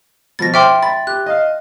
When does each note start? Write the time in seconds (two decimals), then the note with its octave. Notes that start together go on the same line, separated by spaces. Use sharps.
0.39 B2 F3 A6 A#6
0.54 C5 E5 G5 C6 D6 F6
0.83 B5 A6
1.07 G4 F#6
1.26 D#5 F5